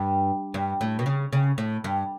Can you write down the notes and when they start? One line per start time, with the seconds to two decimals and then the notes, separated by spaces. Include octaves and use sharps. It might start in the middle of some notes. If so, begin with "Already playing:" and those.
Already playing: G2
0.54 G2
0.81 A2
0.99 B2
1.06 C#3
1.33 C#3
1.58 A2
1.84 G2